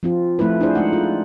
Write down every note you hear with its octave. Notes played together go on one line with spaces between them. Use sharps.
F3 C4 F4
F3 A3 C4 E4 B4
D4 E4 G#4 C5
G#3 A3 D#4 F#5
F4